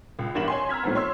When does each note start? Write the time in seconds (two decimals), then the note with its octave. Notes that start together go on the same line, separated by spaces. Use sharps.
0.19 C#2
0.34 A1 E2 G2 A#4 E7 F#7
0.48 C#5 G#5 C6
0.69 A#5 E6 F6 G#6 B6
0.83 A2 F3 B3
0.95 C#5 C6 E6